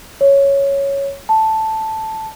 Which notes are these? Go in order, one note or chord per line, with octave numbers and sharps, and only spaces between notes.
C#5
A5